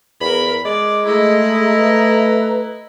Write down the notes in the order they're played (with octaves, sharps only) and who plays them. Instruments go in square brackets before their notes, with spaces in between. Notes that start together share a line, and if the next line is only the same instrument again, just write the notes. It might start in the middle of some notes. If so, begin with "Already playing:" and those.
[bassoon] E2 [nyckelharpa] A#4 B5
[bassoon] G#3 [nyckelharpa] D5
[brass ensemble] A3 A#5 [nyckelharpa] E4 D#5 [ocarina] G#4
[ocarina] B4